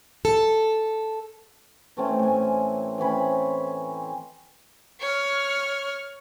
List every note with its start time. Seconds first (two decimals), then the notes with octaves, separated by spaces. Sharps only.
0.25 A4
1.97 E3 A3 C4 C#4
2.19 A2 G#5
2.98 E3 C4 C#4 B5
5.00 C#5 F6